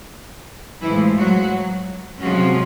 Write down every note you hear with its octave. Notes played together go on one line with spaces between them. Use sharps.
A2 E3 F3 G#3 E4
F#3 F#4
C3 F3 F#3 G#3 C#4 F#4